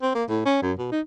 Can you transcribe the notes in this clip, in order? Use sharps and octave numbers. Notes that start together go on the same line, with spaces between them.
C4
A#3
A2
C#4
F#2
B2
D#4